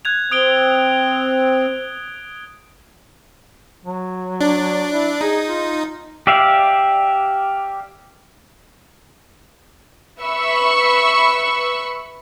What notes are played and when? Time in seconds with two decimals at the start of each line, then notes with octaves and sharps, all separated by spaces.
0.05 F#6 G#6 F7
0.31 C4 D#6 D7 G7
3.85 F#3
4.41 D4
4.93 E4
5.21 D#4 G#4
5.48 F4
6.27 G4 D5 E5 F5
10.20 B4 E5 B5 C#6 E6